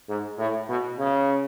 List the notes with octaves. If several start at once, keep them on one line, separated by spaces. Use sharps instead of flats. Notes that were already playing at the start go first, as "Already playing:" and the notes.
G#2
A2
B2
C#3